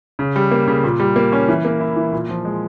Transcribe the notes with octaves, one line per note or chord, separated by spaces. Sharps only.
C#3
G3
A#3
C#3
A#2
G3
A#3
C#4
E3
A#3
E4
E3
A#2
F3
G#3